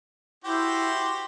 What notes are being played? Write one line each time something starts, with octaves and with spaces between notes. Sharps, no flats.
E4 F#4 G4 C5